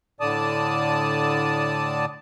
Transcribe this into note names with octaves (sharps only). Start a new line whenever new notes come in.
A2 D3 D5 A5 D#6